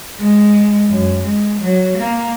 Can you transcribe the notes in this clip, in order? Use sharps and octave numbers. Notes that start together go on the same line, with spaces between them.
G#3
F#2
G#3
F#3
A#3